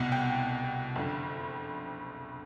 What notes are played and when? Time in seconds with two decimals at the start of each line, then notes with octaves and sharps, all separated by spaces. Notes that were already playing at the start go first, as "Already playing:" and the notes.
Already playing: C2 B2 F#5
0.12 G5
0.95 F#1 F2 D3